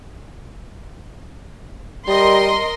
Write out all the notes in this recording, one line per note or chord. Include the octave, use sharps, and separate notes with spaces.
G3 A#4 D#5 C6